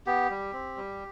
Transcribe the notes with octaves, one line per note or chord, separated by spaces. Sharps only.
B3 G4
G3
C4
G3